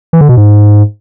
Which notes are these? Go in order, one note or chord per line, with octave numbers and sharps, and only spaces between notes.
E3
D3
B2
G#2